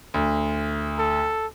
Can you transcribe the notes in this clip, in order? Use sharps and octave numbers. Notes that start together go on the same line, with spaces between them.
D2
A4